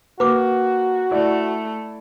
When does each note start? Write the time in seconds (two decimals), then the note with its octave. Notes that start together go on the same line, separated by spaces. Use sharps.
0.20 A#3 F#4 B4 D6
1.11 A3 E4 D5